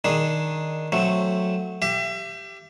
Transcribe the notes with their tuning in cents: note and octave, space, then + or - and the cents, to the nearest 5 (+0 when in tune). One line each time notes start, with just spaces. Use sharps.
D#3 +0 D4 +0 G#4 +0
F#3 -10 A3 +0 C4 +0
G4 +0 E5 +35